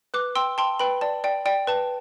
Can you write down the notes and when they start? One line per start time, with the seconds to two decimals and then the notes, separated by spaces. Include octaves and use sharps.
0.14 B4 D6 F#6
0.35 G5 C6 E6
0.58 G5 A5 C6
0.80 B4 G5 B5
1.01 D5 A5
1.24 D5 G5
1.46 D5 G5
1.67 B4 A5